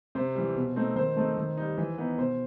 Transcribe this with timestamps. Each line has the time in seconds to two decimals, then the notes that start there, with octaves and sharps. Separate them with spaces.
0.15 C3 C5
0.35 E3 G3
0.55 B2
0.76 A3 C4 D#4
0.96 D#3 C5
1.16 A3 C4 D#4
1.37 D#3
1.57 G3 D#4
1.78 E3
1.98 B3 D#4
2.18 B2 C5